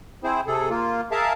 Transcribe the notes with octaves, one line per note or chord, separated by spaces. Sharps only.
C4 E4 G#4 C5
C3 G#4 A4
A#3 F4
G#4 A#4 E5 F5 A5